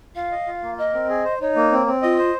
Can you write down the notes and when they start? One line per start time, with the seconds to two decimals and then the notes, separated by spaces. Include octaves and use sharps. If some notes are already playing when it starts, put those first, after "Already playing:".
0.16 F4 F5
0.32 D#5
0.47 F4
0.63 A#3
0.78 A#4 D#5
0.94 C4
1.09 G#4
1.24 C5
1.41 D#4 C#5
1.56 A#3
1.72 C4
1.87 C4
2.02 F4 D#5
2.18 C5